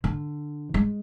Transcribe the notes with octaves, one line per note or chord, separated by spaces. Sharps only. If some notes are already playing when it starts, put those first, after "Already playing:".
D3
G#3